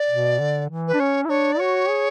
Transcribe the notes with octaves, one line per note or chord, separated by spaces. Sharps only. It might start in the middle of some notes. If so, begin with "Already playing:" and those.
Already playing: D5
B2
D3
E3
B4
D4
C#4 C#5
E4
D4 C#5
D5
F#4 C#5
G#4